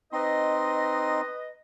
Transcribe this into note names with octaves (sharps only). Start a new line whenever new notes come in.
C4 D#4 B4 D#5 C6